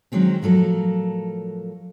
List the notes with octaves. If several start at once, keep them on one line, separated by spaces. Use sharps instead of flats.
D#3 F#3 G#3 C4 C#4
A2 F3 F#3 A4 A#4